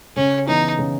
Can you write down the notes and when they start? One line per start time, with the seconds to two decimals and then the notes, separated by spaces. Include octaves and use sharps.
0.16 C#3 C#4
0.47 E3 B3 D#4 E4
0.79 C#3